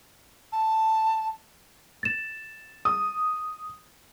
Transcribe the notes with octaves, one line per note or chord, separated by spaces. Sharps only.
A5
A6 E7
D#6